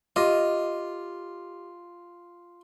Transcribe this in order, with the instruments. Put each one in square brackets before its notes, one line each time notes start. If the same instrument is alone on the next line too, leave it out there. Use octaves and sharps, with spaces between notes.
[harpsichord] F4 [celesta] G4 D6 [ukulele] D#5